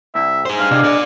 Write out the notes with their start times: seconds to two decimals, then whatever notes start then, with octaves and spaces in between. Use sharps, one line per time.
0.15 C2 E5
0.45 G#4 C5
0.59 G2 F5
0.71 C3 D4 G#4 D#5
0.84 A#4 D5